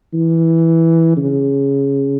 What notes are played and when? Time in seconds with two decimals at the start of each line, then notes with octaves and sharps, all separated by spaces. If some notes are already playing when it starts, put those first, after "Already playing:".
0.13 E3
1.17 C#3